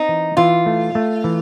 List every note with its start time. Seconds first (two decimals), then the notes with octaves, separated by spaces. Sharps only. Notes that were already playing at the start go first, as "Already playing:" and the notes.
Already playing: C4 D#4
0.09 E3
0.37 E3 F4
0.66 A3
0.95 A3
1.24 E3